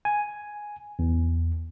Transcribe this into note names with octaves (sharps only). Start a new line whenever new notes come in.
G#5
E2